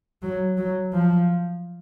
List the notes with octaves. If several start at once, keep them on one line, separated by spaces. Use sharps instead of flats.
F#3
F#3
F3